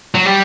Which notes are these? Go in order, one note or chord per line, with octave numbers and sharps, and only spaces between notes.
F#3
G3